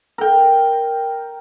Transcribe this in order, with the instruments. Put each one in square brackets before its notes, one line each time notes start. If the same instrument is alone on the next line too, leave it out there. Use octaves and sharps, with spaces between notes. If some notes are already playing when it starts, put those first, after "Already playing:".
[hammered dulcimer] A#4 G5